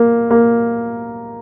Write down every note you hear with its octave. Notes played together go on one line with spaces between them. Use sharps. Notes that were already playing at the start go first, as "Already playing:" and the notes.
Already playing: A#3
A#3